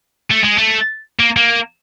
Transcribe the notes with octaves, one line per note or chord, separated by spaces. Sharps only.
A3
G#3
A3
A#3
A#3